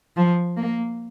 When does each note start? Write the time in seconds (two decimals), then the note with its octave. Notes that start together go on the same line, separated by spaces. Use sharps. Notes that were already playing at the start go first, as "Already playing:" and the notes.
0.17 F3
0.57 A#3